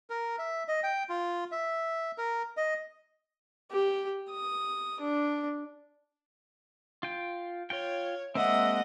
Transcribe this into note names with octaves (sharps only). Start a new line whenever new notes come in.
A#4
E5
D#5
G5
F4
E5
A#4
D#5
G4
D#6
D4
F4 G5
F4 C#5 G5
G#3 A#3 C4 D#5 E5 F#5